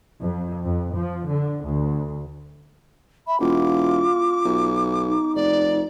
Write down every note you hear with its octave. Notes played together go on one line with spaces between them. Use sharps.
F2
F2
F3
D3
D2
E5 B5
E1 F4 D6
B1
D#4
F1 D5